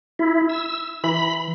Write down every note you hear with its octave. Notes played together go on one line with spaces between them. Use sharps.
E4
E6
E3 B5